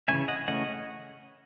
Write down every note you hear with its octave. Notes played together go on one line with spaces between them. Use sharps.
C#3 E3 A3 C#4 E5 G#5
D#5 F#5
C#3 E3 A3 C#4 D#5 F#5